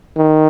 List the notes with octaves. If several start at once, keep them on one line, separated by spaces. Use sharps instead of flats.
D#3